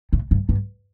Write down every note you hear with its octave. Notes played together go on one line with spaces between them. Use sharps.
A2
G2
G2